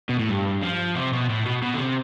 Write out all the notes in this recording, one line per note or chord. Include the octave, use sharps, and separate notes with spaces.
B2
A2
G2
F3
C3
B2
A2
B2
B2
D3
C3